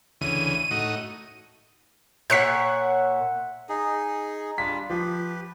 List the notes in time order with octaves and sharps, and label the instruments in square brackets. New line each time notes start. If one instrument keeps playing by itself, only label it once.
[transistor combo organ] D2 C#3 E3 [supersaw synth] D#7
[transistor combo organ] A2 D#4 F#4
[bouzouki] A#2 C#5 [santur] E5 F#5 [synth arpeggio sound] F#6 B6
[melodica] D#4 G#4
[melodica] G3 D4 F4 [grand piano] B6
[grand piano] F3 [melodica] G4 B4